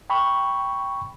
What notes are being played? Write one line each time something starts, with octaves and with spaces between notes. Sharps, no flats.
G5 B5 C#6